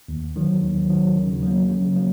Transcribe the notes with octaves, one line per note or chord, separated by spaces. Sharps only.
D#2
D#3 F#3
D#2
D#3 F#3
C#3
F#3 A#3
C#3
F#3 A#3